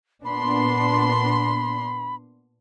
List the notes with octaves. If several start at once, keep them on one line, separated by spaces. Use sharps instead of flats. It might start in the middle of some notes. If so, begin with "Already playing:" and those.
A#2 B3 D4 B5 C6